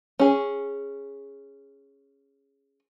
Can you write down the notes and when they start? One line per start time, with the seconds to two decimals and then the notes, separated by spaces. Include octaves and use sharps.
0.20 C#4 G#4